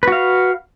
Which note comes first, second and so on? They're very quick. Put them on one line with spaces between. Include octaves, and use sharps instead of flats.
B4 F#4 F5